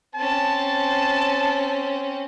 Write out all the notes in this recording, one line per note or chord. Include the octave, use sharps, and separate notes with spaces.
C4 C#4 A5